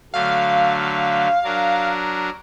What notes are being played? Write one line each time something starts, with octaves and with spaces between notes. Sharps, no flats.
D3 F#3 A3 F5
F#3 D4 A#4